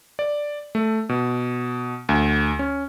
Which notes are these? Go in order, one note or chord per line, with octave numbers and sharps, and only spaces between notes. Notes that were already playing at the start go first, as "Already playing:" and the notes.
D5
A3
B2
D2
C#4